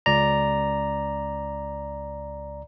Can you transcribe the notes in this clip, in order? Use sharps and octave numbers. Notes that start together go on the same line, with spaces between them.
C#2 D5 A#5